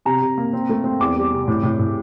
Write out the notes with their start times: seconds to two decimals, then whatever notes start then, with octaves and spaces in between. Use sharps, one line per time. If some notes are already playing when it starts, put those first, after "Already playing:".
0.05 C3 A#5
0.22 C3
0.38 A#3
0.53 C4
0.69 A3
0.84 C4
1.00 E2 D6
1.16 G3
1.31 C3
1.48 A2
1.63 A2
1.79 A2